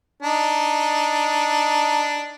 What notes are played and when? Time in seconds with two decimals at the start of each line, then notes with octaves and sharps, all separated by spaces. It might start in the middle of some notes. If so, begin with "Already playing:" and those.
0.23 D4 D#4